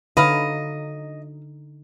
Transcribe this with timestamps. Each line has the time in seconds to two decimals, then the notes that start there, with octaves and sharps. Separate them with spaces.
0.17 D3 F#3 D#4 B4 D#5 F5